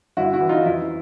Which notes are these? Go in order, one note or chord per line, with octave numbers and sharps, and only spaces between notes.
G1 E4 F#4
E4 F#4
E3
D#4 F4
F2 E4